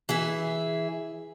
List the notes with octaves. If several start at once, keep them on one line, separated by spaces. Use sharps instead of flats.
E3 G#4 E5